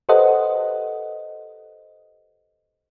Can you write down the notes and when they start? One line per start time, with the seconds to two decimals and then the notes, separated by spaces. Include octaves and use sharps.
0.09 G4 A4 B4 C5 D#5 F#5